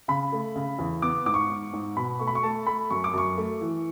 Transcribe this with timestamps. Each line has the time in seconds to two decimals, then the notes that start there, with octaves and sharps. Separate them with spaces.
0.08 C#3 B5
0.32 A3
0.56 C#3
0.79 E2
1.02 B3 D6
1.26 G#2 D6
1.34 C#6
1.50 G#2
1.73 G#2
1.97 B2 B5
2.19 A3 C#6
2.27 B5
2.35 C#6
2.43 A3 A5
2.67 A3 B5
2.90 F#2 C#6
3.04 D6
3.13 F#2 C#6
3.37 A3
3.61 E3